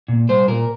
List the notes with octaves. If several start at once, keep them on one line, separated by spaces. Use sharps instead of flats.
A#2
G3 C5
A#2 A#4